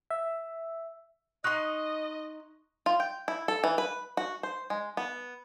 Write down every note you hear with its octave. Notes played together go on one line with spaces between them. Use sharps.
E5
D#4 D#5 C6 C#6 F#6
F4
G5
E4
A4
E3
B4
F#4
C5
G#3
B3